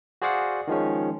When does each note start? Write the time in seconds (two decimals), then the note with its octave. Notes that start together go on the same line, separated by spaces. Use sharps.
0.22 F#4 G#4 C5 D5 F5 F#5
0.68 D#3 F3 G#3 C#4